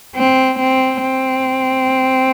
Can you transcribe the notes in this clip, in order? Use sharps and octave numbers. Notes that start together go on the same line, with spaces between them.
C4
C4
C4